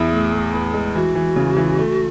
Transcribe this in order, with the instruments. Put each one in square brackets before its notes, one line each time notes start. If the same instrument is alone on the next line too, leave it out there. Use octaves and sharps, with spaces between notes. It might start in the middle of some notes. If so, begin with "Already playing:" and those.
Already playing: [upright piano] E2 E4 [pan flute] G#4
[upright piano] A2
A2
B3
G#3
[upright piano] E3 [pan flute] F#4
[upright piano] E3
C#3
E3
A3